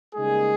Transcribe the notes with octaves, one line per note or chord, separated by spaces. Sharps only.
C#3 G3 G#3 A#3 D#4 G#4